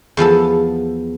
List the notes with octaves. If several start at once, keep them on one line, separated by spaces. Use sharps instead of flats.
E2 F3 B3 A4